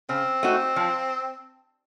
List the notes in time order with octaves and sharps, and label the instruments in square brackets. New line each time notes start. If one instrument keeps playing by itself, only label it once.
[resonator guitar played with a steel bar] C#3 [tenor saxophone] C4
[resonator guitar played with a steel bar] A3 D#4 F#4
F3